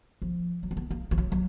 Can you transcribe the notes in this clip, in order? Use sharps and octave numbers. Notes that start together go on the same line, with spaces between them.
F3
F#3
C4
B3
A#3
F3
F#3
F#3